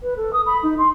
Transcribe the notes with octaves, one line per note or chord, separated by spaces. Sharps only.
B4
A4
D#6
B5
D#4
C6